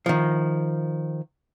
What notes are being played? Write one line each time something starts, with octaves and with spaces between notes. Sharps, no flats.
D#3 F3